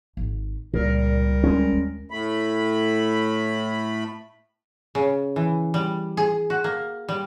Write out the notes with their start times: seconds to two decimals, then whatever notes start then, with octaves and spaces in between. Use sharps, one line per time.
0.17 G#1
0.73 C#2 A#2 G3 A#4
1.44 D2 G#3 C#4
1.72 D#2
2.11 A2 A3 B5
4.95 C#3
5.36 E3
5.74 G3
6.17 G#4
6.50 F#4
6.64 A#3
7.09 G3